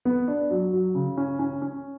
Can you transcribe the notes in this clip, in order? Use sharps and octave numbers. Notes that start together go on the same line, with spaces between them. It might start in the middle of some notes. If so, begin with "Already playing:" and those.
B3
D4
F#3
F#3
C#3
C#4
C#4
C#4